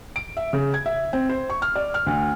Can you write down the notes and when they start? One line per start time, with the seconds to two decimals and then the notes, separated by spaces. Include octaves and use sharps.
0.16 D7
0.37 E5
0.53 C#3
0.74 G#6
0.86 E5
1.13 C4
1.29 C5
1.50 C#6
1.62 F6
1.76 D5
1.94 F6
2.06 D2